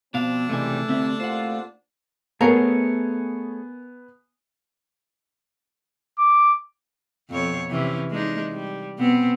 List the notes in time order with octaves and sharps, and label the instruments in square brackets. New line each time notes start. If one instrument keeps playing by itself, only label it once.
[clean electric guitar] B2 F5 [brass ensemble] F3 C4 [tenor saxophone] D4
[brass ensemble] C#2 G#2 G3 [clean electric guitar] C3 E3 G#5 [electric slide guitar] A3
[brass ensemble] C2 [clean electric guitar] D3 C4 E5
[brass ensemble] C2 A#2 F4 [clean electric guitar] C5 F#5
[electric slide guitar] A3 G#4 C#5 [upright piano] B3 G#5 [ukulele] A#4
[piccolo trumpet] D6
[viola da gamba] F2 B2 C#5
C3 E3 C#4
G#3 D4 D#4
G3
B2 B3 C4